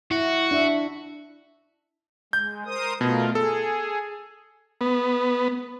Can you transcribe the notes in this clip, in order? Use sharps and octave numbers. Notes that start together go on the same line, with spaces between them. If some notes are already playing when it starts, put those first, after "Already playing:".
E4 F#4
D4 E5
G#3 G6
A#4 C5 D#6
B2 A3 F4 A#4
G#4 A4
B3